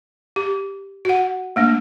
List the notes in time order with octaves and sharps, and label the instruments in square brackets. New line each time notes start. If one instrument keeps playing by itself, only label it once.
[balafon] G4
F#4 F#5
A3 A#3 D4